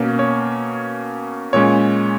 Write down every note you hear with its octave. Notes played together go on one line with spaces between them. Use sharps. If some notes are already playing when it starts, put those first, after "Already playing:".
Already playing: B2 A#3 C#4
C#5
A#2 G#3 C#4 C#5